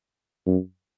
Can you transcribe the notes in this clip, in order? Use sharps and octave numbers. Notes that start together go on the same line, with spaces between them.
F#2